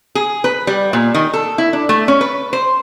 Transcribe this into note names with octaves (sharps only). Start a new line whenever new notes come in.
G#4
B4
G3
A#2
D#3
A4
E4
D4
A3
C#4
B4
C5